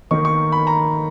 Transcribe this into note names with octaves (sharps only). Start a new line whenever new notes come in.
D#3 A#3 D#4 C#6
C#6
B5
A#5